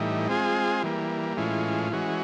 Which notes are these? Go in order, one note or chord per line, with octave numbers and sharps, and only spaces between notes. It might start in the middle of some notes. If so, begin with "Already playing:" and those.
Already playing: A2 E3 G3 D#4
G#3 C4 F4 G#4
E3 G3 A#3
A2 E3 G#3 C#4 F4
E3 G#3 C#4 F#4